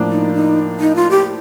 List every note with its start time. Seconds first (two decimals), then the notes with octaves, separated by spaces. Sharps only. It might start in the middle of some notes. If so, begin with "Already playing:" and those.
Already playing: A2 F3 A#3 D4
0.11 D#4
0.34 D#4
0.80 D#4
0.96 F4
1.11 G4